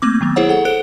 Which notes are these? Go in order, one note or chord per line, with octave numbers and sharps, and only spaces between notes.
A3 A#3 C4 D6
D#3 F#3 B3
E4 G#4 C5 C#5 F#5
A4 F#5
A4 C5 F#6 D7